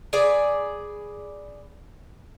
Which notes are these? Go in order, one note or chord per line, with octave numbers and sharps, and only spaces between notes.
G#4 B4 D5